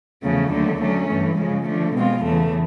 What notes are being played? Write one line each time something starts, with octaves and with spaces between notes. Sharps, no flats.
E2 C#3 F3 A3
D#2 D3 F#3 A3
D3 F#3 A3 C#4
G2 E3 A3
C#3 F3 G#3
D3 F3 A3
B2 G#3 C4 F4
E2 C#3 E3 A3